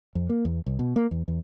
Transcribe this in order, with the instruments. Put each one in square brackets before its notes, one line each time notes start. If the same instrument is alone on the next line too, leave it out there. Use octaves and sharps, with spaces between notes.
[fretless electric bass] F2
A#3
E2
C2
B2
A#3
E2
E2